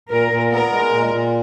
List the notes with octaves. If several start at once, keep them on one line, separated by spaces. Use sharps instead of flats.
A#2 A#4
A#2
B3 A#4
G#3
A#2
A#2